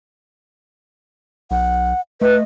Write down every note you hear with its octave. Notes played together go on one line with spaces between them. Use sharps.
B1 F#5
A3 B4 D#5